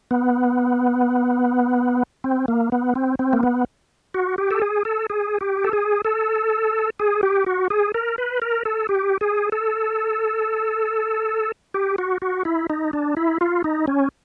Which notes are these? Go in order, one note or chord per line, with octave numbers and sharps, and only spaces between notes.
B3
C4
A#3
B3
C4
C4
A#3
B3
F#4
G4
A4
G#4
A4
G#4
G4
A4
G#4
A4
G#4
G4
F#4
G#4
A#4
B4
A#4
A4
G4
G#4
A4
G4
F#4
F#4
E4
D#4
D4
E4
F4
D#4
C#4